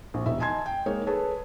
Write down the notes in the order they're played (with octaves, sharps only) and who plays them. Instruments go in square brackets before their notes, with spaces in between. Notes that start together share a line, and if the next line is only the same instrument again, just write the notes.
[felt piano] A#1
E1 D#4 E5
D#5 G#5 A5 C6 G#6
G5
G#3 A#3 D#4 C#5
G#4 A4 B4 C#5 A5